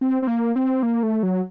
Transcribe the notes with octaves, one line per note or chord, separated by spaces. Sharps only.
C4
C4
A#3
C4
A#3
A3
F#3